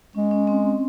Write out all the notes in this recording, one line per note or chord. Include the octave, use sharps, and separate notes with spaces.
G#3 C#4
C#4
C4